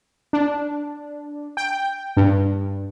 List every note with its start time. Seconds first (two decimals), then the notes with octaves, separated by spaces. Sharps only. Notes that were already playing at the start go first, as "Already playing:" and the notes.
0.33 D4
1.57 G5
2.17 G2